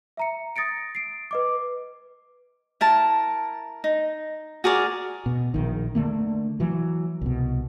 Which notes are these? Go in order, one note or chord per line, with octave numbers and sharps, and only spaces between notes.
E5 A#5 C#7
D#6 A6 A#6 C#7 D7
C7 D7
B4 D#5 D6
E4 A#4 A5
D#4
F#4 G#4 A#4 D5
B2
A#1 D#3
D3 E3 A3 A#3
E3 F#3
C2 B2